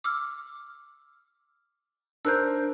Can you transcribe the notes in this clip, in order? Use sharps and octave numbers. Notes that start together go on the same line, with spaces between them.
D6 E6 F6
D4 A#4 C5 E6 F#6 G6